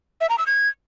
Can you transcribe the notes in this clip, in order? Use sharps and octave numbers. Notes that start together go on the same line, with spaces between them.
E5
A#5
E6
G#6